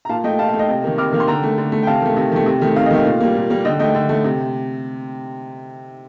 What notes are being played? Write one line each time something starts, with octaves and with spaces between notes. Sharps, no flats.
A#5
A#2 F5 A5
A3 D#5 G5
A#2 F5 A5
F5
A3
D#5 G5
C3
D#3 A#3
C3 D6 F6
D#3 A#3
C6
D3 G5 A#5
A3
D3
A3
G5
C3 F5 A5
D#3 A3
C3
D#3 A3
C3
D#3 A3
C3 F5
D#5
D#3 A3 F5
A#2
G3 A#3
A#2
G3 A#3
D3 D#5 G5
A3 D#5 G5
D3
A3
C3